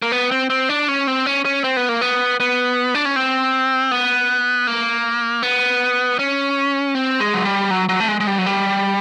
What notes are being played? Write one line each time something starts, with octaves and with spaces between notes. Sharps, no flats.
A#3
B3
C4
C4
D4
C#4
C4
C#4
C#4
C4
B3
A#3
B3
B3
D4
C#4
C4
B3
A#3
B3
C#4
C4
G#3
F#3
G3
F#3
F#3
A3
G#3
G#3
G3
F#3
G3